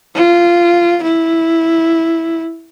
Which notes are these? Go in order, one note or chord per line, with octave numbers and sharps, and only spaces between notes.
F4
E4